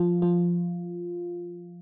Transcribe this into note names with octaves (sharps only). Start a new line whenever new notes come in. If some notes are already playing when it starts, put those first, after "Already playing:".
Already playing: F3 F4
F3 F4